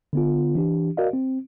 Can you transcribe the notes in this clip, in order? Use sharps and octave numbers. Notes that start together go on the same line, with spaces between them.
D3 B3 F4
E3 D4 G4
F#4 A#4 D5 D#5 F5
C4